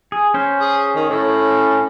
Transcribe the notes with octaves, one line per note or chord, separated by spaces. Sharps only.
G#4
C#4 C5
G#4
D#3
A2